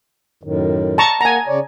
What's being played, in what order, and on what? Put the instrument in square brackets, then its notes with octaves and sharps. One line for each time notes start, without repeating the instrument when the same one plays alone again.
[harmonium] F#2 A2 D#3
[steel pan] A5 A#5 C#6
[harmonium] A#3 F#5 [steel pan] G#5 A#5
[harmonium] C#3 C#5 D5